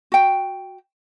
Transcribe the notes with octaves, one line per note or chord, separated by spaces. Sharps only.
F#4 G5